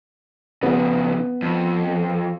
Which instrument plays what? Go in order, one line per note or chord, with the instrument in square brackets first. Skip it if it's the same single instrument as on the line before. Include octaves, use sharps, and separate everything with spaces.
[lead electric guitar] F2 C#3 [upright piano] B3
[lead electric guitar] F2